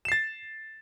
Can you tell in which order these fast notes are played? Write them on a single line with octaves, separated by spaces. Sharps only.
E7 C7 A6